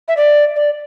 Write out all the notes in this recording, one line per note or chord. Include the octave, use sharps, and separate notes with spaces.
E5
D5
D5